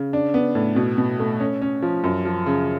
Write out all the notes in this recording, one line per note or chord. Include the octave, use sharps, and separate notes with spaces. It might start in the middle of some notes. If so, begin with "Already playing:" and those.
Already playing: C#3
D4
B3
A2
B2
B2
A3
C#4
C#4
F3
F#2
F3
C#3